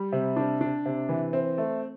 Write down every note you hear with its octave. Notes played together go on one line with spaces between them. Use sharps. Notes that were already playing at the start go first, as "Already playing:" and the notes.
Already playing: G3
C3
D4
D4
C3
E3
C4
A3